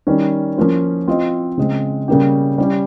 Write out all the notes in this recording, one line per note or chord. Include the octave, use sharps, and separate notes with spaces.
D#3 G3 C#4
F3 A#3 C#4 F4 C5
C4 F4 C5 D#5
C#3 G#3 C4
C#3 G3 A#3 C#4 G4
G3 C#4 G4